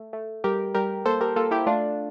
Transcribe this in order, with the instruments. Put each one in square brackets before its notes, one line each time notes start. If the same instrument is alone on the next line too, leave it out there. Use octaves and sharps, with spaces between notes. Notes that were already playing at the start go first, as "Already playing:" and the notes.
Already playing: [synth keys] A3
A3
G3 G4 A#4
G3 G4 A#4
A#3 A4 C5
G4 A#4
A#3 F4 A4
E4 G4
A3 D4 F4